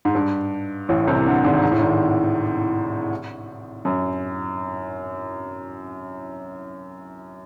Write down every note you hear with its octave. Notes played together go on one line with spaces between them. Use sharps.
G#2
G2
A1 A2
C2 C3
D2 D3
G#1 G#2
G#2
A2
G#1 G#2
F#2